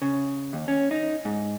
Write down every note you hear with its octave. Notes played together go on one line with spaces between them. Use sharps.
C#3
D#2
C#4
D#4
G#2